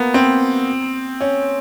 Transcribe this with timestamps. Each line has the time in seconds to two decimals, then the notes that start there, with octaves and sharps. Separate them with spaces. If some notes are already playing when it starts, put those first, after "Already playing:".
Already playing: A#3 B3
0.14 C4
1.20 C#4